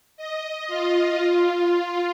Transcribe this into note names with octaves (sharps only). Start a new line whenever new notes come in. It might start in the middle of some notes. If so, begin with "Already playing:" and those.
D#5
F4
F4